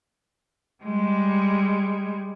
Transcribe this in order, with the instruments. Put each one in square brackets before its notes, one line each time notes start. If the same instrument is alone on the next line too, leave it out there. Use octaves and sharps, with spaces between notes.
[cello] G3 G#3